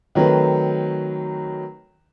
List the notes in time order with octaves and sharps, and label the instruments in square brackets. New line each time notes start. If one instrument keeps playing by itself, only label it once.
[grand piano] D#3 F#3 A3 C4 B4